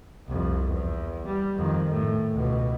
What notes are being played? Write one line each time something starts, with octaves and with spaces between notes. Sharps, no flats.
C2 F2
E2
G3
F2 D#3
A2
C#2 B2